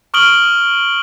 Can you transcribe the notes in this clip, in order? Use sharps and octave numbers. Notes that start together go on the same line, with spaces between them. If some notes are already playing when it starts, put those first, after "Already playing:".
C#6 D#6 F6 D7 F#7 G7